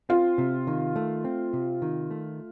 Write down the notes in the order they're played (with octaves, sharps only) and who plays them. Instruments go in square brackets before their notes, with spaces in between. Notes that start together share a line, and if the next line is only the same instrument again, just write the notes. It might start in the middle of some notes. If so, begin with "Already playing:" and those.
[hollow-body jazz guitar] C4 [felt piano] F4
[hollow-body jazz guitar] C3
D#3
A3
C4
C3
D#3
A3